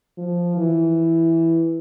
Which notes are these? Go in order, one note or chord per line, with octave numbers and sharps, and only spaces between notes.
F3
E3